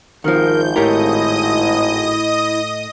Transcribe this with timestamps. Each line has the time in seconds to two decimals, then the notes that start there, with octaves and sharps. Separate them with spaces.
0.24 G#1 D#3 F3 A#4 G6
0.76 A2 E4 G4 A#4 D#5 D#6